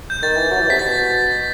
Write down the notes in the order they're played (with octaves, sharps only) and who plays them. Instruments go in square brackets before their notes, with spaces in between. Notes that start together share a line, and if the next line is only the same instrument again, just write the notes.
[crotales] G6
[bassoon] D#3 [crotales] A6
[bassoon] E3
F#3
E3
[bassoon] C3 [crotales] B6
[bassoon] B2 [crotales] A6